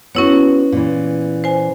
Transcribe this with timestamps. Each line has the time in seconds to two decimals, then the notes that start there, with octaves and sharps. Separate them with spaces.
0.15 B3 C#4 E4 F#4 C#5
0.72 A#2 E3
1.44 C5 G#5